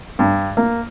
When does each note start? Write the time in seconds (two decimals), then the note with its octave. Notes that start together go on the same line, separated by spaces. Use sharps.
0.19 G2
0.57 A#3